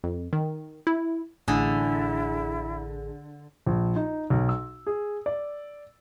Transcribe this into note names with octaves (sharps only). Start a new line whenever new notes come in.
F2
D#3
E4
A1 D3 E4 G#4
A#1
D#4
B1
E6
G#4
D5